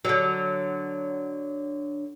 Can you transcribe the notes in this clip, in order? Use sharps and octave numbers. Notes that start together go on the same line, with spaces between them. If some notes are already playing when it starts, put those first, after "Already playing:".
D3 F#3